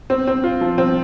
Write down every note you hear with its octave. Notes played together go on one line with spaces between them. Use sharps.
C4
C4
F4
F3
C4